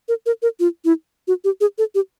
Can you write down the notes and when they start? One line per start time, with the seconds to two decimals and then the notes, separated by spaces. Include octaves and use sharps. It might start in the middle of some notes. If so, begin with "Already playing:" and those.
0.08 A#4
0.26 A#4
0.42 A#4
0.60 F4
0.85 E4
1.28 F#4
1.44 G4
1.61 G#4
1.78 A4
1.95 G4